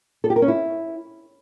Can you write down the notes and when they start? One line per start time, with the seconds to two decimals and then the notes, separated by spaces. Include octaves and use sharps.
0.24 A4
0.30 G4
0.36 A#4
0.42 C#4
0.48 E4